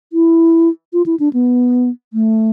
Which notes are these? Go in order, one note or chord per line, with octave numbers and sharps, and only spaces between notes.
E4
F4
E4
D4
B3
A3